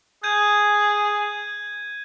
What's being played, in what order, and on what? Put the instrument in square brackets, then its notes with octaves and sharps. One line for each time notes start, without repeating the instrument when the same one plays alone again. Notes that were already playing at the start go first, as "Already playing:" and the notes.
[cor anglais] G#4 [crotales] G6 G#6 D#7